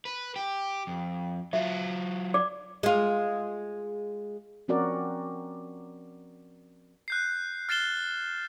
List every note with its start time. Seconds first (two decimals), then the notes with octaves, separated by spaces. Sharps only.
0.05 B4
0.36 G4
0.87 F2
1.53 F#3 F4 E5
2.34 D5 D6
2.83 G#3 F4
4.68 F3 C4 C#4 F#4 A#4 D5
7.08 F#6 G6 C7
7.69 F6 A6 C7 E7 G7